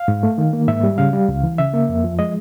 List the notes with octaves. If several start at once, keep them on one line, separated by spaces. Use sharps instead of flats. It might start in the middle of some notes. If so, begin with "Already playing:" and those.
Already playing: F5
G#2
A3
D#3
A#3
G#2 E5
G3
C#3 F5
G3
C#2
E3
C#3 E5
A#3
F2
F3
G#3 D#5